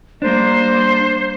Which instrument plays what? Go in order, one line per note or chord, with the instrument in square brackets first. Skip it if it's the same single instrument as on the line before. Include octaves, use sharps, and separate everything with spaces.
[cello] G3 A#3 [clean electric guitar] D4 [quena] C5